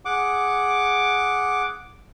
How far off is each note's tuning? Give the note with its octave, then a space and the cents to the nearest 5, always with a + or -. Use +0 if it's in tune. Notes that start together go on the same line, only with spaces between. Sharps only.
G#4 +0 F#5 -5 D6 +0